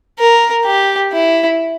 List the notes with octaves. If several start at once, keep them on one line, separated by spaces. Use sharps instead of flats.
A#4
G4
E4